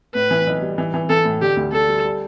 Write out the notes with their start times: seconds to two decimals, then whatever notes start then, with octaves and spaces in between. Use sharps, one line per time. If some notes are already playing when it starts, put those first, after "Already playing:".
0.15 A2 B4
0.31 E3
0.47 B1
0.62 G3
0.78 E3
0.94 E3
1.10 E3 A4
1.25 A2
1.41 D3 G4
1.57 D2
1.72 D3 A4
1.89 G3
2.05 G3